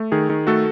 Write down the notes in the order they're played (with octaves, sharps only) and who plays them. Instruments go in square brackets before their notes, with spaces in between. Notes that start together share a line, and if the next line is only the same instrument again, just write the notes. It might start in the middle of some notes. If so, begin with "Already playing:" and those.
Already playing: [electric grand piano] A3
D#3 G#4
D#3
A3 F#4 A4